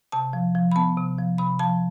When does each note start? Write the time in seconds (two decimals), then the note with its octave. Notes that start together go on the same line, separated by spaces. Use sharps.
0.12 C3 A5
0.33 F3
0.55 F3
0.72 B5
0.76 B3 A5
0.97 C3
1.18 F3
1.38 C3 B5
1.59 F3 A5